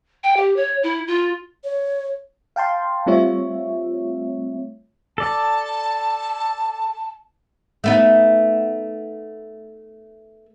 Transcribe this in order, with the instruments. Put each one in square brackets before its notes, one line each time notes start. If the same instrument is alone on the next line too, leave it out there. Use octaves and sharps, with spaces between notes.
[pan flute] G5
G4
C#5
E4
F4
[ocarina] C#5
[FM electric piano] F5 G5 A5 C6
G3 A3 C4 F4 C#5 E5
[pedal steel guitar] A4 D5 [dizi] A5
[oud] A3 B3 D#4